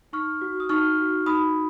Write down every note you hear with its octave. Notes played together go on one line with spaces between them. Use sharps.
D#4 C#6 F6
F#4
D#6
D#4 C#6 F6
F#4
D#4 B5 D#6